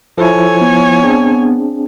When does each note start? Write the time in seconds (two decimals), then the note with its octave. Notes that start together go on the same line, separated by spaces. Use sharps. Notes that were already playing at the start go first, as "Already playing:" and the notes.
0.18 F3 E4 A4 C#5 G#5
0.61 B3
1.03 C4 D4 G#4